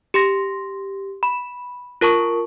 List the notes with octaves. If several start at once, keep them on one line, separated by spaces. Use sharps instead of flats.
G4 C6 A#6
B5
F4 A#4 A5 C#6